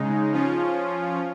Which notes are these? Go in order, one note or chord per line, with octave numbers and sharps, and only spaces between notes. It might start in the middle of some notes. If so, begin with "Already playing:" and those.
Already playing: C#3 G#3 D#4
F3 C#4 F4